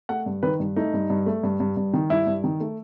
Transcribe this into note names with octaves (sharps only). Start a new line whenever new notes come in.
A3 F#5
G2
D#3 B4
G2
A3 D#4
G2
G2
A3
G2
G2
G2
D#3
G2 E4
G2
D#3
A3